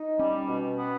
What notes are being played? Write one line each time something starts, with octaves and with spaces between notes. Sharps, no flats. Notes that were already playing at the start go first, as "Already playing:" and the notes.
Already playing: D#4
G3 C#4
B2
B3